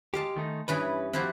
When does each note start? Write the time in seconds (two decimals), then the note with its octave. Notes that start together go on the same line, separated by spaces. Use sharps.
0.14 G#3 G4 F5 A5
0.36 D#3 A3 D#4
0.68 G2 E3 C#4 G#4 B4
1.13 E3 F3 C4 E4 F#4 G4